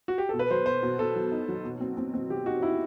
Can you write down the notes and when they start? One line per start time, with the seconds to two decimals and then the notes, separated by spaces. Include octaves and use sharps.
0.08 F#4
0.18 G4
0.29 B2 A4
0.39 B4
0.50 F#3 C5
0.66 B2 C5
0.83 B2
0.99 B2 A4
1.16 F#3
1.32 D#4
1.48 F#3
1.64 B2
1.81 C4
1.97 C4
2.14 C4
2.30 F#3 G4
2.46 D#4 F#4
2.62 D#4 E4